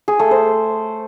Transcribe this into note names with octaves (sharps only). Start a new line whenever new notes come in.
G#4
A3
C5